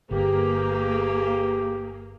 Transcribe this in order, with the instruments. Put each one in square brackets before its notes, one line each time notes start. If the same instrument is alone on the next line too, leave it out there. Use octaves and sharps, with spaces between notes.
[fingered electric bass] G1 [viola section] A#3 G#4 [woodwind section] G4 [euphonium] B4